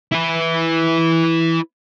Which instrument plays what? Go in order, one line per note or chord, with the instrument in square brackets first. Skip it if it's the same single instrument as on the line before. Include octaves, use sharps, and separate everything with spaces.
[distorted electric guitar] E4 B4